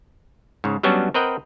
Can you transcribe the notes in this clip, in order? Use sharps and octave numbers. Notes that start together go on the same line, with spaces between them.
G#2 C#3
F#3 G3 B3 C#4 D4 F#4
C4 A#4 B4 D#5 F#5 G5